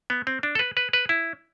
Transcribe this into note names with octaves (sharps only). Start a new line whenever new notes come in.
B3
C4
D4
A4
B4
B4
B4
E4